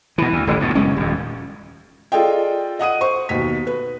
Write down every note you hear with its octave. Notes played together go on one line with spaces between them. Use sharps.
B2 E3
D2
D#1 A1 E3
G2 B2
F#1 G#3 C#4
D#1 F2
F4 G#4 A4 D5 D#5 G5
D#5 F#5 D#6 D#7
C5 C#6
D#2 B2 B6
B4